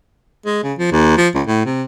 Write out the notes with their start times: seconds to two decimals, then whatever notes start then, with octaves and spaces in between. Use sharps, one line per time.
0.46 G#3
0.64 C#3
0.79 F3
0.92 D#2
1.17 F3
1.35 C#2
1.47 A2
1.66 C3